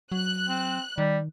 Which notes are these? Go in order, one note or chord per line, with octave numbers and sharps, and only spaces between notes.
F#3 F#6
C4
D#3 G3